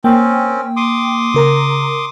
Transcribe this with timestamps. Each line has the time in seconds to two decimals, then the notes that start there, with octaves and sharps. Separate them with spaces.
0.04 A#3 C4 C#4 G5
0.76 C6 D6 D#6
1.34 C#3 A#4 A#5